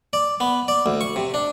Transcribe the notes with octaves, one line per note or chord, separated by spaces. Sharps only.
D5
B3
D5
D2
C#6
C3
D4